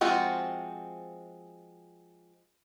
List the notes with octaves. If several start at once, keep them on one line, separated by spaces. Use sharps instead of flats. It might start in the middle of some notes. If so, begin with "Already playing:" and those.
F3 G#3 C4 F4 F#4